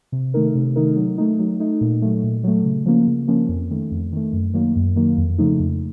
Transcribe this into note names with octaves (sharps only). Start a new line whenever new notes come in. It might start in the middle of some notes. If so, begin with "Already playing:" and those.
C3
D#3 A3 D#4 A#4
C3
D#3 A3 D#4 A#4
F#3
A3 D#4
F#3
A3 D#4
A#2
F#3 A3
A#2
F#3 A3
C#3
F3 A#3 C#4
C#3
F3 A#3 C#4
F2
D#3 A3
F2
D#3 A3
F#2
D#3 F#3 A#3
F#2
D#3 F#3 A#3
F2
C#3 F3 A3 D#4
F2